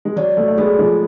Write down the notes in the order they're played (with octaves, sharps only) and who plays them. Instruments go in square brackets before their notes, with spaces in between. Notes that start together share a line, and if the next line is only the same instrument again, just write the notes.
[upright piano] G#3
[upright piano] F#3 [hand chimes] D5
[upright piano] F#3 A3
A3
[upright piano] G#3 B3 [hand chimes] G#4
[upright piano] F3 G#3